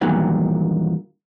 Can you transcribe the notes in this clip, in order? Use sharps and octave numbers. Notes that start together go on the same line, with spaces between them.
E2 G2 A#2 D#3 F#3